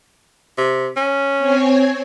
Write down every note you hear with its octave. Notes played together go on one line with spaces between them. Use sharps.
C3
C#4
C4 C#5 G#5